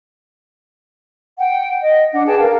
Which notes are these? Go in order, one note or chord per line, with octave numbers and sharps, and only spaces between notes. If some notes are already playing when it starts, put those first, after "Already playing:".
F#5 G5
D#5
D4 F#5
G#4 B4 G5 A5
A#4 F5